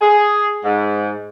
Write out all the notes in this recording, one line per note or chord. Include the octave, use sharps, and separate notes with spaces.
G#4
G#2